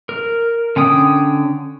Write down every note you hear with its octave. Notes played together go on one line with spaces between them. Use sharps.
A#4
D3 C#4 G5 D#6